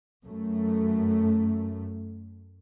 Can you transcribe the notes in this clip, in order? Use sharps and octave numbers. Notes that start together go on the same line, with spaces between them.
F#2 A3